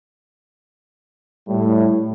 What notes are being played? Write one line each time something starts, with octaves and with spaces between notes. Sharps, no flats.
A2 G3